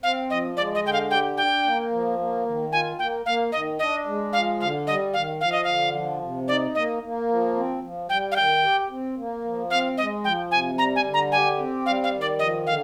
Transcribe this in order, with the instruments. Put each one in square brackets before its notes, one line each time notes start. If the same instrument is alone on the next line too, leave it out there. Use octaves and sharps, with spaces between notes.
[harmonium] C4 [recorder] F5
[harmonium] F3 [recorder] D#5
[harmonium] G#3 [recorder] D5
[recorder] D#5
[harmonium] D3 [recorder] G5
[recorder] F5
[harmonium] G4 [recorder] G5
[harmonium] D4 [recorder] G5
[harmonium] A#3
F3
A#3
D#3
[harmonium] F4 [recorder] G#5
[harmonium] A#3 [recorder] G5
[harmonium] A#3 [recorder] F5
[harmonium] D#3 [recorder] D#5
[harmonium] D4 [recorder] D#5
[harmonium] G#3
[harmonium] F3 [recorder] F5
[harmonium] D3 [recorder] F5
[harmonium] G3 [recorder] D#5
[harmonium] D#3 [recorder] F5
[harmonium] F3 [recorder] F5
[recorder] D#5
[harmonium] D3 [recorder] F5
[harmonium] F3
C3
[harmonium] D#4 [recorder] D5
[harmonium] A#3 [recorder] D#5
[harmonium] A#3
F3
C4
F3
[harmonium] G3 [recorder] G5
[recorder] F5
[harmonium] D#3 [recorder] G5
[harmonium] G4
C4
A#3
F3
[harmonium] C4 [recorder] F5
[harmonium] G#3 [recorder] D#5
[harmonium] F3 [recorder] G5
[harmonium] C3 [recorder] G#5
[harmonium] G3 [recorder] A#5
[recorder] G#5
[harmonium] D3
[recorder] A#5
[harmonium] G4 [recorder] G#5
[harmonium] C4
[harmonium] G3 [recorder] F5
[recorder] F5
[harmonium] D#3
[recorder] D5
[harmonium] F3 [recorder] D#5
[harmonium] D3 [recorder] F5